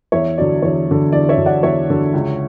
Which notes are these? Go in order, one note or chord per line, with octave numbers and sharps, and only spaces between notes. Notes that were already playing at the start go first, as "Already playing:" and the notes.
E2 C#5 E5
D3 F#3 D5
E2 C#5
D3 F#3
E2 D5
C#5 E5
D3 F#3
D5 F#5
E2 C#5 E5
D3 F#3
C#2